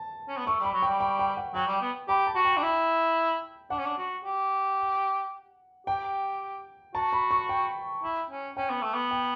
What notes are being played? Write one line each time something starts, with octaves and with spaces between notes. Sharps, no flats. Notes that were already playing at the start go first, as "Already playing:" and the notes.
Already playing: A5
C#4
B3
A3 C#6
G3 B5
F#3
G3 G5
G5
G5
F#5
F#3 G5
G3
B3
G4 B5
A5
F#4
G5
D4
E4
D4 F#5
C#4
D4
F#4
G4
G4 G5
F#4 A5
B5
C#6
G5
E4
C#4
C#4 G5
B3
A3
B3
G5